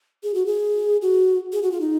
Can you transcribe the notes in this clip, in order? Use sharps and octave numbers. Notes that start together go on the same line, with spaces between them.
G#4
F#4
G#4
F#4
G#4
F#4
F4
D#4